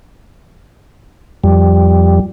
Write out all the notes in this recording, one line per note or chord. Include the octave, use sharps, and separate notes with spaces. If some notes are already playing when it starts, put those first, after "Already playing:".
F2 G3